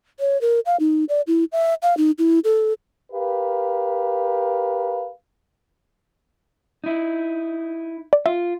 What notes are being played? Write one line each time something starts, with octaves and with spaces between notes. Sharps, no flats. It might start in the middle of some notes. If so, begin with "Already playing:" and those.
C#5
A#4
F5
D#4
D5
E4
E5
F5
D#4
E4
A4
G4 A#4 B4 F5
D#4 E4
D5
F4 E5